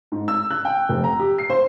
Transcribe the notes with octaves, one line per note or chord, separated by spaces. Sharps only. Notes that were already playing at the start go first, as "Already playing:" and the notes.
G#2
E6
F#6
G5
F1
A#5
G4
C7
C5